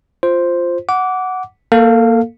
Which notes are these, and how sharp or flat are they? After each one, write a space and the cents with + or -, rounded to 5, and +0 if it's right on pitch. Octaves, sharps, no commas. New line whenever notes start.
F4 +0 C5 +0
F#5 +0 D6 -20
A#3 +0 A4 +25 F5 +0